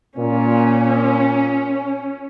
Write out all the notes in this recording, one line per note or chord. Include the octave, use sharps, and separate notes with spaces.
A#2 C#4